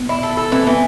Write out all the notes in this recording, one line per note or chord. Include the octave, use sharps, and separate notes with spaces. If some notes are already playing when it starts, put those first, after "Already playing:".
Already playing: B3
E4
A4
A4
E3 C4
E3 B3